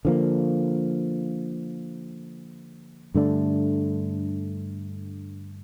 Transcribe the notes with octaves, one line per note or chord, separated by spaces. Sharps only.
D3 F3 A#3
G2 D3 A3 D4